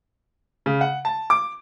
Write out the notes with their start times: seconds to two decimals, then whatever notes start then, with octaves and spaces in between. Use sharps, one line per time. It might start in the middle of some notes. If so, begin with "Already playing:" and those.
0.66 C#3
0.81 F#5
1.05 A5
1.30 D6